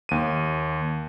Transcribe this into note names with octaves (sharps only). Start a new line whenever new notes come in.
D#2 D#7